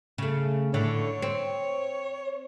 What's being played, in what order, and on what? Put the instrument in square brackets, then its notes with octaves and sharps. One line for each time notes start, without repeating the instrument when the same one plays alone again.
[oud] C#3 A3
[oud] A2 D3 A3 [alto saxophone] C#5
[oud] C4